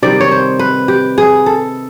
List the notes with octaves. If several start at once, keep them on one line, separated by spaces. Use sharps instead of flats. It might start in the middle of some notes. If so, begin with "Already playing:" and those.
C3 D#3 G3 D5
C#5
C5
B4
G4
G#4
A4